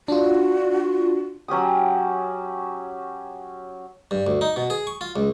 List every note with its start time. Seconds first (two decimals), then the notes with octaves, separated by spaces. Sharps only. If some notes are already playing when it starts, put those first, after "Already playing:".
0.08 D4 F4 F#4
1.48 F#3 C#4 G4 D#6
4.11 G2
4.27 D2
4.41 D#4
4.56 B2
4.70 G#4
4.87 C#6
5.01 F4
5.16 C#2